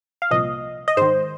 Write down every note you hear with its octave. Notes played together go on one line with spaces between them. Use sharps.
F5
C2 A#2 F3 D#5
D#5
G#2 D#3 C5